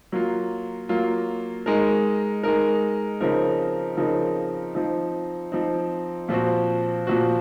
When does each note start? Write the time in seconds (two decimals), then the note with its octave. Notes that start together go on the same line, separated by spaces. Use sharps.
0.12 F#3 A#3 F4
0.89 F#3 A#3 F4
1.66 G#3 D#4 A#4
2.44 G#3 D#4 A#4
3.21 C#3 F3 C4 D#4 A#4
3.97 C#3 F3 C4 D#4 A#4
4.75 F3 C4 D#4
5.52 F3 C4 D#4
6.29 A#2 F3 C4 F#4
7.07 A#2 F3 C4 F#4